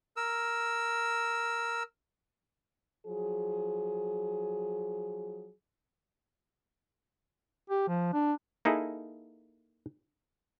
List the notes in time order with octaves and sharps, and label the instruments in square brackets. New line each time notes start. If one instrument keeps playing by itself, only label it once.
[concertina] A#4 E6
[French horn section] F3 F#3 G#4
[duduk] G4
F3
D4
[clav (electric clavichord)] A#3 D#4 E4 G#4 A4